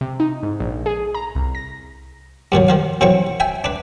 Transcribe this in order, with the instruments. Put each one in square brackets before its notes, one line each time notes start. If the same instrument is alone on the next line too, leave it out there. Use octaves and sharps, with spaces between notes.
[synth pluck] C3
D#4
G#2
A#1
G#4
A#5
C2
A#6
[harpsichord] G2 A#2 D#3 F#3
D#3 F3 F5
A#2 E3 F#3 C4 E4 C#6
E5 G5 G#5
D4 B4